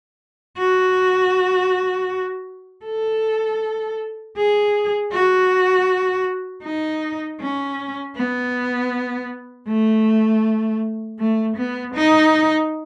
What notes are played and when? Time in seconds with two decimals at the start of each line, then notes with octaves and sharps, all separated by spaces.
0.58 F#4
2.85 A4
4.37 G#4
5.12 F#4
6.64 D#4
7.40 C#4
8.16 B3
9.68 A3
11.19 A3
11.57 B3
11.95 D#4